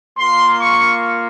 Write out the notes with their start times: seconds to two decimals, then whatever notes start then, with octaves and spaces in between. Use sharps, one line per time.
0.17 A#3 F4 C6
0.59 C#6